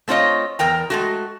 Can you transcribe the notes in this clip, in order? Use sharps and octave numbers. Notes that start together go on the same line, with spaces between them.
A3 C4 F4 C#5 D#5
E2 A#4 G5 A#5
G#3 A3 F#4